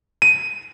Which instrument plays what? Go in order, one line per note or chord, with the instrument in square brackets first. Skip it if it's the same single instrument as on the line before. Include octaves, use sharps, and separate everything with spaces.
[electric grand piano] D#7